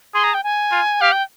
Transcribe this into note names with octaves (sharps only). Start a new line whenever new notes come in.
G#4 C6
A#5
G5
G#5
F4
G4 F5
G5